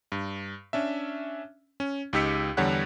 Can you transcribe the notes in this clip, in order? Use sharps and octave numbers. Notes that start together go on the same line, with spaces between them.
G2
C#4 D4 E5
C#4
C#2 D#4 G4 E6 B6 C#7
E2 D3 G3 C#5 F#5 F#6